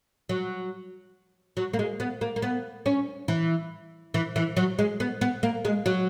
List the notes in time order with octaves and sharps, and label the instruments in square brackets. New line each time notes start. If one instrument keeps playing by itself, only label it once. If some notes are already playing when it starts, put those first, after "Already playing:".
[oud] F#3
F#3
A#3
G#3
B3
A#3
A#3
B3
C#4
E3
E3
E3
F#3
G#3
B3
B3
A#3
G#3
F#3